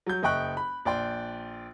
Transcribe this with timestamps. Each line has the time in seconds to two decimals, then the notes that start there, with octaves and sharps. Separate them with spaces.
0.06 F#3 G6
0.23 F#1 D#5 E5 G5 C#6 F#6
0.57 B5
0.85 A#1 D5 G5 C6